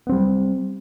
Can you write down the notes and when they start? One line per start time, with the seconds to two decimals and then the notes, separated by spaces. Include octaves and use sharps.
0.07 B3
0.09 C4
0.12 G3